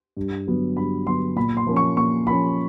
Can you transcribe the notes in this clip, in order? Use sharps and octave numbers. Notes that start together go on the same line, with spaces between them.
G2
D3 F#3 B3
G2 B5
D3 F#3 B3 C6
A#2 B5
C6
F3 A#3 C#4
C#6
A#2 C#6
F3 A#3 C#4 B5